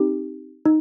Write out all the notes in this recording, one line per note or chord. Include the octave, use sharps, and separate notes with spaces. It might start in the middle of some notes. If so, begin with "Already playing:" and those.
Already playing: C4 D#4 G4
D#4